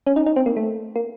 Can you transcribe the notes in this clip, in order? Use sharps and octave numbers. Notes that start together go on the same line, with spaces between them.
C#4
D#4
D#4
C4
A#3
A3
A#3